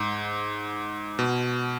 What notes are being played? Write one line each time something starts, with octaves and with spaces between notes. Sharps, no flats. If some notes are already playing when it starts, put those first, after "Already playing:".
Already playing: G#2
B2